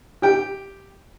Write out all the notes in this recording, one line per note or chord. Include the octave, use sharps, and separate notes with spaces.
G4 G5